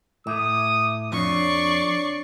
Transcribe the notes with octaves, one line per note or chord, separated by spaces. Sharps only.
A2 E5 D6 D#6
F2 D4 C#5 D5 C#6 C7